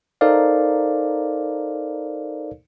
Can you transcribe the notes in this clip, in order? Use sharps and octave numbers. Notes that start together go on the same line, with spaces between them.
D#4 A4 A#4 C5 D5 F5